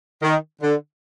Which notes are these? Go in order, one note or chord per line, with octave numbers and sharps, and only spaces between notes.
D#3
D3